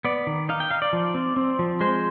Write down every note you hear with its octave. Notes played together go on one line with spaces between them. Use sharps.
B3 D5
D#3
D#4 F5
G5
D#4 F5
D5
F3
C4
C4
F3
G#3 C5